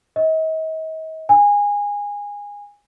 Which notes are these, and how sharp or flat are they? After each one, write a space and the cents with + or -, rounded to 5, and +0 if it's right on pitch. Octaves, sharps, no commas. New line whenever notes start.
D#5 +40
G#5 -20